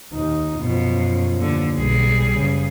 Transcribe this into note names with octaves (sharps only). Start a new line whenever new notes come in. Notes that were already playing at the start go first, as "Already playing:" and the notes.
D#2 D#4
F#2 B2 F3
D#2 D3
B1 G3 G#4
F#1 C#3